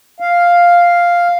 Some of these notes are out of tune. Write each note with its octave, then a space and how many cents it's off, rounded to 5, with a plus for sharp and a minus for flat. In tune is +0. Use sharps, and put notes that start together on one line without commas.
F5 +0